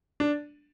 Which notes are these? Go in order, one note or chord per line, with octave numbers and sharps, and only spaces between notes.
D4